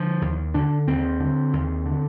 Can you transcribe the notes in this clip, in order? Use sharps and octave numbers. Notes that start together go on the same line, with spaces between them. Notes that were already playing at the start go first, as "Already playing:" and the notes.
Already playing: D3 F3
D#2
D3 D4
D#2 C4
D3
D#2
D3